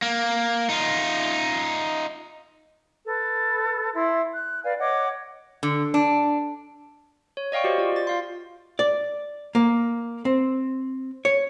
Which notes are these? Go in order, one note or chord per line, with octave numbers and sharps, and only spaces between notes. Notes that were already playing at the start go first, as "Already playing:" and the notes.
A#3
D#4 F4
A4 B4
E4 C6
F#6
B4 D5 F5 G#5
C#5 D#5 F#5 D6
D3
D4
C#5
D5 D#5 F5 G5 C#6
F#4 G4 C5 D#5
F4 D5
F4 A6
F4 F5 C6
D5
A#3
C4
C#5